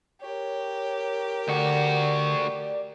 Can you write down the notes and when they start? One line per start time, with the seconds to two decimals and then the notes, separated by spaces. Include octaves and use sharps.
0.21 G4 A#4 C#5
1.48 D2 D3 F#4 D5